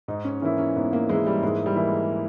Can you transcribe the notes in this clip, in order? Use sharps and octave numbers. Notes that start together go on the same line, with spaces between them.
G#2 D#4
C#4
E3 A#3 C#4 E4
C#4
G#2 B3
A#3
E3 G#3 A#3 E4
G3
G#2 G#3
G3
E3 A#3 E4
G#3